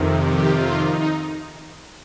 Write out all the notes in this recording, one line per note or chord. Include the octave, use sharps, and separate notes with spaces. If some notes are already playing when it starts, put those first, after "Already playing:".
Already playing: F2 C3 D#3
G4
F4
D#4